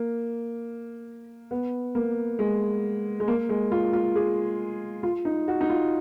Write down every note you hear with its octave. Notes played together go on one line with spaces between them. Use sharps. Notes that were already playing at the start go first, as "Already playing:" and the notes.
Already playing: A#3
B3
A#3
G#3
G#3
A#3
G#3
F4
F4
G#4
F4
D#4
F#4
D#4
F4